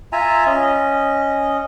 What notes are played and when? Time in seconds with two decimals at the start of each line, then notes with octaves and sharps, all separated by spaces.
0.13 F4 E5 G#5 A#5
0.46 C#4 D#5